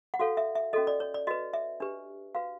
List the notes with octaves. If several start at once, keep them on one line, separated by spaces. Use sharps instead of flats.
F#5
F#4 A4 C#5 F5
E5
E5
C#4 F#4 A4 D#5
D5
C#5
D5
F#4 B4 D#5
E5
D4 G4 B4
F#4 B4 F5